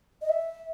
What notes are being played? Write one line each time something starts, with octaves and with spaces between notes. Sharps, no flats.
D#5
E5